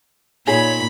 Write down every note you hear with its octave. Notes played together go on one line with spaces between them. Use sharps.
A#2 D#4 F4 G#4 C#5 B5